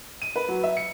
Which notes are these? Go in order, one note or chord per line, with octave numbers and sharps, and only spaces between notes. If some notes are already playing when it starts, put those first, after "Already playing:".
D#7
B4
F#3
E5
C#7